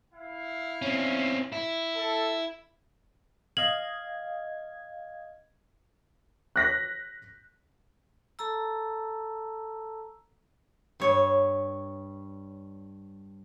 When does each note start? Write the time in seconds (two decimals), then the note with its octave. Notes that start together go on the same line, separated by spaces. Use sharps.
0.13 E4 F5
0.82 C4 C#4
1.52 E4
1.94 A4
3.57 D#5 F5 G#6 F#7
6.56 F#6 A#6 B6
8.39 A4 A5 A#5 E6
11.00 G2 C#5